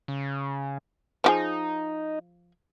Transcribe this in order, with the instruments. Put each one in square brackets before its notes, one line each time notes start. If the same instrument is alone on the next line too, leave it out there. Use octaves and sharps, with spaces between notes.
[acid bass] C#3
[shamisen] F3 G4 G#4 [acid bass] D#4